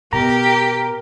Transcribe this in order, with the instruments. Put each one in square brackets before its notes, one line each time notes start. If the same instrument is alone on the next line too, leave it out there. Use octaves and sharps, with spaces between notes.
[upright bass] B2 [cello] G4 [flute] A#4 [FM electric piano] A#5